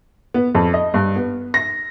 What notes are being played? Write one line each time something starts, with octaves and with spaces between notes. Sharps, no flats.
B3
F2
D#5
G2
B3
A#6